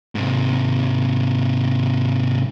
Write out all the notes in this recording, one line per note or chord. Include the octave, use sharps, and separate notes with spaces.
G#2 C3